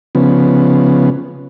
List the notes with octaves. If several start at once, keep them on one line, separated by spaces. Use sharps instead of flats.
C#3 F3 B3